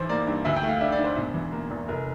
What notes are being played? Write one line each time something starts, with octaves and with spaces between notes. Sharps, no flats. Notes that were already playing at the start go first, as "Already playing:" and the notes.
Already playing: A1 E3 C5
A#3 D5
G2
D2 E5
G5
A3
F5
D4 E5
D5
D3
C5
E1
E3
A#3
E2
F1 A#4